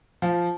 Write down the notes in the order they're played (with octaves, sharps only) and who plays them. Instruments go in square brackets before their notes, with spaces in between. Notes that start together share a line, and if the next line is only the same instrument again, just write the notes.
[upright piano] F3